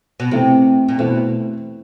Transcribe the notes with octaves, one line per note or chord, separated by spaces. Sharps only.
B2
C3 E3 A3 C4
A#2
B2 E3 A3 C4